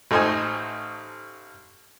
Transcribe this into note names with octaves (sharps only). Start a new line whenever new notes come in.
A1 A3 D#4 C5 D#5 G#5